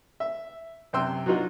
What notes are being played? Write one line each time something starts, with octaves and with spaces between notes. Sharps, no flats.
E5
F#2 C3 G5 C6 E6
F#3 D4 D#4 F4 F#4